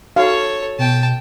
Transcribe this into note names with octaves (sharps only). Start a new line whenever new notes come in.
D#4 F#4 A4 C#5 F5
B2 G5 A5